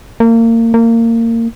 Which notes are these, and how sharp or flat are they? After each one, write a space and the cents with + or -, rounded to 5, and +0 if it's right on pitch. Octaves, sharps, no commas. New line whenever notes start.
A#3 -30
A#3 -25